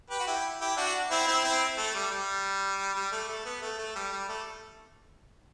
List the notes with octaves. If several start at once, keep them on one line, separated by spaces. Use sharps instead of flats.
G4 B4
F#4
E4 G4
E4 G4
D4 F#4
C4 E4
C4 E4
C4 E4
A3
G3
G3
G3
A3
A3
B3
A3
A3
G3
G3
A3